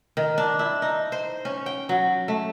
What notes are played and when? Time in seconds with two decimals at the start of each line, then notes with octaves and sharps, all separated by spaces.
0.17 D#3
0.38 D4
0.59 E4
0.82 D#4
1.12 C5
1.45 C#4
1.66 G5
1.89 F#3
2.28 A3